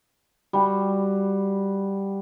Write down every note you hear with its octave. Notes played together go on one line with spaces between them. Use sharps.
G3 F#4